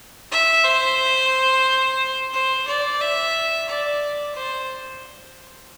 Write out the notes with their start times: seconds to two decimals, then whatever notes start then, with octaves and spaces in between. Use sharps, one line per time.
0.32 E5
0.65 C5
2.34 C5
2.68 D5
3.01 E5
3.68 D5
4.35 C5